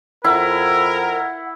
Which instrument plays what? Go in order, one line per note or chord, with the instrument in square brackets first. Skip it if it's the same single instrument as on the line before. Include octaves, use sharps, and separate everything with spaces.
[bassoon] F2 [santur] E4 [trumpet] A#4 [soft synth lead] F#5